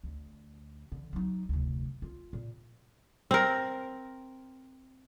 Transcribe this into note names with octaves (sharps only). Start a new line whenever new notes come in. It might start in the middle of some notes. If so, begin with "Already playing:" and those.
D2
D3 E3
F#3 D#4
F1 D2
F4
A#2
C4 A#4